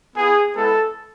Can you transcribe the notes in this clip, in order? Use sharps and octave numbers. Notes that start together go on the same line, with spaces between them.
B3 E4 G#4
G#3 B3 E4 A4